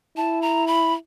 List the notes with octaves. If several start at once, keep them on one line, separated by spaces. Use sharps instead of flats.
E4 A5
A#5
B5